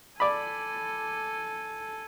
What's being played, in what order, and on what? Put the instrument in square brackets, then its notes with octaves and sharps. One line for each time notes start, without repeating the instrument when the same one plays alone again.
[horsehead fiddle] A4 G#5 [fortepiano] D5 B5